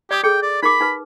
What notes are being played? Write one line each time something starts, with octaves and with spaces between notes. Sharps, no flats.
G4 D5 D#6
G#4 A4 G5
D5
D#4 A#4 B5 D6
D#4 B4